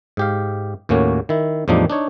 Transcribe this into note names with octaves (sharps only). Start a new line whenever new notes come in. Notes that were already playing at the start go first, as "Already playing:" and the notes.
G#2 G4 F5
D#2 A2 A#3 C#4 F#4
D#3 E4
E2 A2 F3 G3 D4 D#4
D4 D#4 C#5